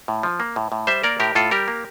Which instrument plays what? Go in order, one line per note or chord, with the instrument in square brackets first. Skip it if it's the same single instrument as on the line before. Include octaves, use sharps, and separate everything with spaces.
[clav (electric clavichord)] A2
F3
A#3
A2
A2
G3 C5 E5
A#3 A#4 D5
A2 G4 A#4
A2 F4 A4
G3 G4 A#4
A#3